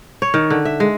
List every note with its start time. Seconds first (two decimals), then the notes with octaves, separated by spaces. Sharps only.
0.22 C#5
0.34 D#3
0.50 D3
0.65 E5
0.80 G#3